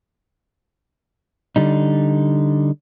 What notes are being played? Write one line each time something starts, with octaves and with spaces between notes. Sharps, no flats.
D3 G3 D#4